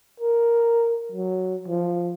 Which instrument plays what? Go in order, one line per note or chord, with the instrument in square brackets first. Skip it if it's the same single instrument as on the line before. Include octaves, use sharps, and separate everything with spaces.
[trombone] A#4
F#3
F3